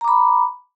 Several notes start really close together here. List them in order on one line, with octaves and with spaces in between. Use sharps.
A#5 D6 B5